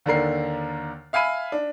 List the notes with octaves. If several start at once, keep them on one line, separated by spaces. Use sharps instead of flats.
D#2 D3 D4 A#4 C7
E5 F5 G#5 B5 D#7
D4